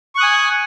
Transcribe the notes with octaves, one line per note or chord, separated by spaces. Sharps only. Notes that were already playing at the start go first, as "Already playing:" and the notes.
G#5 C#6 D#6 F#6